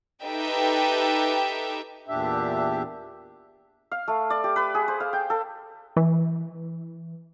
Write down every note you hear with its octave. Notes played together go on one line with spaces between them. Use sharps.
D#4 G4 A4 B4 E5 G5
E2 A#2 D4 G4 E5
F5
A3
D5
G4
B4
G#4
C5
F5
G5
A4
E3